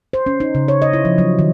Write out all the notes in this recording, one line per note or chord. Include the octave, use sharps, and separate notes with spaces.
C5
C#4
D#4
C#3
C#5
D#5
E4
F3
F#3
D#3